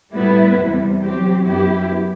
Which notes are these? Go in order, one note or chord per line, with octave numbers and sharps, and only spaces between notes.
A2 G3 B3 E4 B4
E2 C3 G3
F#3 C4 G4
F#2 F#3 B3 E4 G4